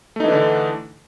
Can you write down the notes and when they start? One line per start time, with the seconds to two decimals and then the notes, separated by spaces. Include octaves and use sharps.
0.16 A3
0.20 D#4
0.24 E3
0.28 D4
0.32 D3